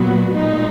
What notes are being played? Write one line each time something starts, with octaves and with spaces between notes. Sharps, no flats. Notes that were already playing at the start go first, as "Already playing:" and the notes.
Already playing: A#2 F#3 B3 F#4
A#2 G#3 D#4